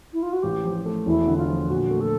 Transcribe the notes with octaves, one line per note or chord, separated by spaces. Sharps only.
E4
F4
F#4
A1 G4
F3
A3
E1 E4
D3
F4
F3
A#2 F#4
A3
A4